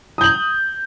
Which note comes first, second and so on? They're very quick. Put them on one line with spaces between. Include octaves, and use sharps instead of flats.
D#6 G6 F#7